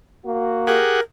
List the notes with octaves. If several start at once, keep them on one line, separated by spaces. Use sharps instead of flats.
A#3 F#4
G4 G#4 A#4 F#5